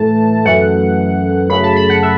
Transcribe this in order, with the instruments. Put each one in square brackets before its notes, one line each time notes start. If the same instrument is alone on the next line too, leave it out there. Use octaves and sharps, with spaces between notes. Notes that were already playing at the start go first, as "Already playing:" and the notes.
Already playing: [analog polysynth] A2 E3 A3 A5
F#2 E3 A3 F#5
F#2 C#3 A3 B5
A5
B5
F#5
E5